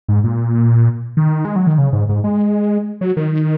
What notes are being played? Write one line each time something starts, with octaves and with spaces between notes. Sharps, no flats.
G#2
A#2
D#3
G#3
F#3
D#3
C#3
G#2
G#2
G#3
F#3
D#3